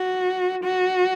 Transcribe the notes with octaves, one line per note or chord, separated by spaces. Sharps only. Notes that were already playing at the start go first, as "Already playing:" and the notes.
Already playing: F#4
F#4